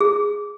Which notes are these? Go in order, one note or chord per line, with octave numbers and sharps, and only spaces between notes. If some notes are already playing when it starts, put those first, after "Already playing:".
G#4